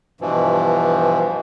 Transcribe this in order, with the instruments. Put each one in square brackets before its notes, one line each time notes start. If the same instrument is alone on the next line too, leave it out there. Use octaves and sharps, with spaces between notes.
[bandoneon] G2 B2 E3 F3